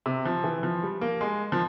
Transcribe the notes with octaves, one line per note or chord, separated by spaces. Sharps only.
C3
F3
E3
F3
G3
A#3
G#3
F3